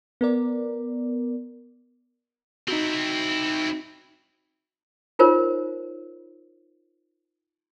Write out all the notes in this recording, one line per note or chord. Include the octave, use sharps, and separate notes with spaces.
B3 A#4 D5
C4 D#4 E4 F#4
D#4 F4 A#4 C5 C#5